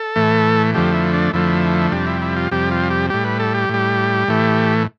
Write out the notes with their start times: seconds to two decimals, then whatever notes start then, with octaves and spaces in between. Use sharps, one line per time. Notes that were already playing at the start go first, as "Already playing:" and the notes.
Already playing: A4
0.16 A2 E3 A3
0.74 F2 D3 F3 A3 G4
0.94 E4
1.14 D4
1.33 F2 D3 F3 A3 E4
1.92 F2 C3 G3 D4
2.07 E4
2.22 E4
2.36 F4
2.51 F2 C3 G3 G4
2.71 F4
2.91 G4
3.10 A2 G3 G4
3.24 B4
3.40 A4
3.55 G4
3.69 A2 G3
4.28 A2 E3 A3